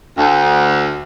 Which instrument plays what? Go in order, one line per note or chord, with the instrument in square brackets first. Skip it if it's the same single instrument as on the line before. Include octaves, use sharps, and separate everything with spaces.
[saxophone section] D2